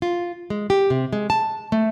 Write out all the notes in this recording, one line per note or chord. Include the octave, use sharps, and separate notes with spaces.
F4
G#3
G4
C3
G#3
A5
A3